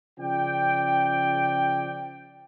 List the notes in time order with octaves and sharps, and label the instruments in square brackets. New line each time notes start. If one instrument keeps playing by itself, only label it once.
[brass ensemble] C#3 F3 D5 G5